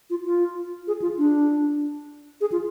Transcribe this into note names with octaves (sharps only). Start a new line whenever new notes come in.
F4
F4
G#4
F4
D4
G#4
F4